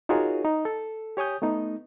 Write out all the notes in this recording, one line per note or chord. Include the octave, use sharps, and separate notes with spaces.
D#4 F4 F#4 G#4 A#4 C#5
D#4
A4
G4 C#5 G#5 D#6 G6
A3 B3 D#4